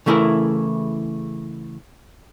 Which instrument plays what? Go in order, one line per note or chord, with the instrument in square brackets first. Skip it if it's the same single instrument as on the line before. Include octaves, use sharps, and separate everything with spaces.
[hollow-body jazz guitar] C#3 E3 A3 E4 G#4 A#4